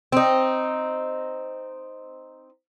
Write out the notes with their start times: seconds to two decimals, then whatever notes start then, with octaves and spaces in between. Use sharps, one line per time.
0.12 C4 D#4